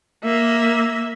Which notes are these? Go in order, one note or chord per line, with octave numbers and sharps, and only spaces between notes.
A#3 E5